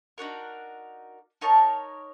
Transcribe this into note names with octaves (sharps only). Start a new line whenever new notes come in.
D4 D#4 F#4 A#4
D#4 A#4 C#5 A5